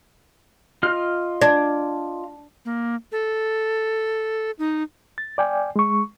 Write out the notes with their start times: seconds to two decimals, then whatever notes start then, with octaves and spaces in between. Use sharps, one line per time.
0.83 F4 D#5 F6
1.42 D4 D5
2.65 A#3
3.12 A4
4.59 D#4
5.18 A6
5.38 D5 G5 G#5
5.76 G#3 C#6